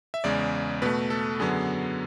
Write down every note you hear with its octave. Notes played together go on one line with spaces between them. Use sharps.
E5
E2 C#3 G#3 D5
B2 A3 B4
A4
F#2 D3 F#3 B3 G#4